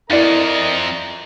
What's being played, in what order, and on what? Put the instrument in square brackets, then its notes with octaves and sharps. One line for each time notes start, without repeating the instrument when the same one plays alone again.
[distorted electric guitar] F2 [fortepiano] E4 D5 [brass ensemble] A#4 D#5 A#5